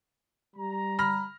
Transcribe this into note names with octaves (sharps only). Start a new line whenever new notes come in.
G3 A#5
B5 F6 A#6